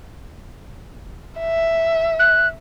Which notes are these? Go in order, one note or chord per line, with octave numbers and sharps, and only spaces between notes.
E5
F#6